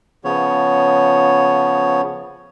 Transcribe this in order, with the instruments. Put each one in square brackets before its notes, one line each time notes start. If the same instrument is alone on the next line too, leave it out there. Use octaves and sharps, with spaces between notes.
[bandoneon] C#3 F3 B3 C#5